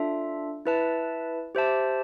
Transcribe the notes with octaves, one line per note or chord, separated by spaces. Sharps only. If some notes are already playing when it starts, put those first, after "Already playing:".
Already playing: D4 F4 A4 E5
E4 B4 E5 A5
G4 C5 E5 A5